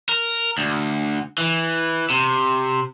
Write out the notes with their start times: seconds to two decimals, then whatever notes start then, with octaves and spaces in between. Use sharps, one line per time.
0.09 A#4
0.58 D2
1.38 E3
2.10 C3